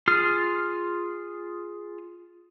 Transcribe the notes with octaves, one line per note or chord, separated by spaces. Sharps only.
F4 G#4 F6